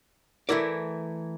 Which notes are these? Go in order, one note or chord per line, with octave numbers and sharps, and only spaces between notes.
E3 A3 E4 A#4 D5